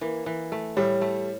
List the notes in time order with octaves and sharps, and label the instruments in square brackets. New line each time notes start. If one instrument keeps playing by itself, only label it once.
[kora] E3 [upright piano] A#3
[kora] E3
A3
[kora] A2 [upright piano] G3
[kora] A3